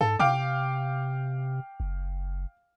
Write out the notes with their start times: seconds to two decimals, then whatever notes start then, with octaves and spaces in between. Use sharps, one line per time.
0.01 G#2 A4
0.19 C3 F5 G5 D6
1.80 F#1